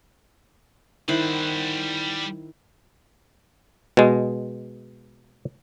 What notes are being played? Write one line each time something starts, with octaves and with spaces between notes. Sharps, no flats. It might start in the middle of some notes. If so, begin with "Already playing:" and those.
D#3 G3 E4 C5 F#5
B2 G#3